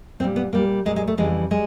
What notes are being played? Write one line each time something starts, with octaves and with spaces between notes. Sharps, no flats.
A#2 G3 C4
B3
A#2 G3 A#3
A#2 G3 G#3
G#3
A3
F2 C#3 E3 G3 G#3
G3 G#3